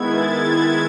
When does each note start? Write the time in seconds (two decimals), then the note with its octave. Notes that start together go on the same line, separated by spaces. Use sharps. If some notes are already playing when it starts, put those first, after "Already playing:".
Already playing: D#3 G#3 B3 E4 G#6
0.09 A6
0.42 G#6